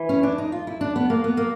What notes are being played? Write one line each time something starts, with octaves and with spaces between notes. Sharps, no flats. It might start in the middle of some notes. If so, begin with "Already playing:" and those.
Already playing: E3
C#4
D4
D#4
F4
E4
D4
B3
A#3
B3
A#3